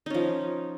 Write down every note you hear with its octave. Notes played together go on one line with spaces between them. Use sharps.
F3 C#4 D#4